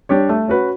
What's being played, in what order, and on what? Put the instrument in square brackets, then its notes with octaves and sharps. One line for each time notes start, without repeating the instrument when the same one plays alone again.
[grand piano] G3 D4 G4 C#5
A3
C#4 F#4 B4